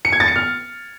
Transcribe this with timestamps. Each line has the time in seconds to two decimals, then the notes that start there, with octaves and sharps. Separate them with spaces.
0.05 C#7
0.12 G#6
0.20 A6
0.28 C#7
0.36 F6